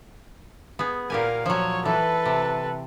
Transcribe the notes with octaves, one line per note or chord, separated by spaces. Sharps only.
B3 G#4
A#2 G4 A#4 F5 G#5
F3 F#3 C#5
E3 A4 B4
C3